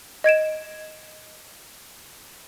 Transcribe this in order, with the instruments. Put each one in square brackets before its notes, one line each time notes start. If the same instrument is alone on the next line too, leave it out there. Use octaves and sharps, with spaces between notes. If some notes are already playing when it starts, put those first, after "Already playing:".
[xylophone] D#5 G#6 D7 E7